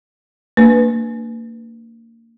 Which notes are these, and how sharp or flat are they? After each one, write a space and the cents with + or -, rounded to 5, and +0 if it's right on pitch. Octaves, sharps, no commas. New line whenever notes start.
A#3 -30 D4 +0 B4 +0